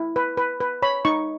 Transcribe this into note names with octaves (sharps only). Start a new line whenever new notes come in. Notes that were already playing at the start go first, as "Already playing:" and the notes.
Already playing: E4
B4
B4
B4
C#5 B5
D#4 C#6